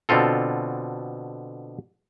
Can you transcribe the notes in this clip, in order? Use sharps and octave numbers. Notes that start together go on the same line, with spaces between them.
B2 D3 C4 F4 A4